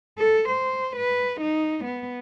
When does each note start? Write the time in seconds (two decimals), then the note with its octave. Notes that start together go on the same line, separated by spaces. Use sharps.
0.18 A4
0.49 C5
0.96 B4
1.41 D#4
1.85 B3